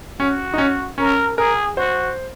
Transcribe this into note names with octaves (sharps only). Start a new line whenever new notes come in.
C#4 F#4
D#4
C#4
C#4 A#4
G#4 A#4
F#4 C5